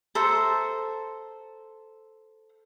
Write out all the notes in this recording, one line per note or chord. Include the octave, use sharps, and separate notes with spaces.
A4 C5 E5 A#5